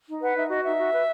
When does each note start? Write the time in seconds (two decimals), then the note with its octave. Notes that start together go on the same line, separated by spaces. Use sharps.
0.08 D#4
0.21 B4 F#5
0.36 D#4 E5
0.49 F#4 D#5
0.64 D#4 E5
0.79 F#4
0.93 B4